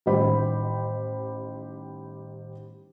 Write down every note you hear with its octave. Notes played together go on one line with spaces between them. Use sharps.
A1 D#3 G3 G4 C5 B5